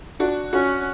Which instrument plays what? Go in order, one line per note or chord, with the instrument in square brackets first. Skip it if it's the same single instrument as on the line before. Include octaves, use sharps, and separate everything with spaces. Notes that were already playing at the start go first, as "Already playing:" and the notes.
[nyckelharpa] D4 [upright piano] F#4
[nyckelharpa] C#4 [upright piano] F#4